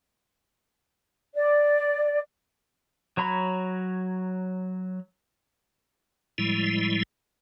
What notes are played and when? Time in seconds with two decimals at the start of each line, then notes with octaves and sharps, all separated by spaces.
1.35 D5
3.17 F#3 C#5 A#5 B5
6.38 A2 F3 G3 G#3 E4